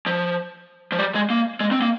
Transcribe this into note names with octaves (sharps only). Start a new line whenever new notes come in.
F3
F3
G3
G#3
A#3
G#3
C4
A#3